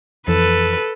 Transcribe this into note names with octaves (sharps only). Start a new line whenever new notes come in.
F2 E3 A4 B4